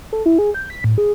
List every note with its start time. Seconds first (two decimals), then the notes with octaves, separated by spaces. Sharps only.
0.13 A4
0.26 E4
0.39 G#4
0.54 G6
0.70 B6
0.84 A2
0.98 G#4